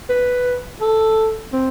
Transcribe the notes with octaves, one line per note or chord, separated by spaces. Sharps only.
B4
A4
C4